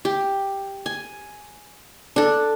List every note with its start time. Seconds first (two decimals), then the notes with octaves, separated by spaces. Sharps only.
0.05 G4
0.86 G#5
2.16 D4 A4